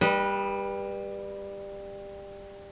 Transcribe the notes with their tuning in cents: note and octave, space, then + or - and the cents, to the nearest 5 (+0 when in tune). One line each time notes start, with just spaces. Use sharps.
G3 +20 B4 -20 D#5 -10